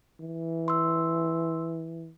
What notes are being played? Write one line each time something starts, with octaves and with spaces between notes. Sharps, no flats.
E3
C6 E6